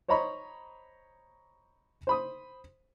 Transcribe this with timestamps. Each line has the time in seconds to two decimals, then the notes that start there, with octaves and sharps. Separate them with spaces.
0.08 C5 C#5 D#5 A#5 B5 C#6
2.07 C5 B5 D#6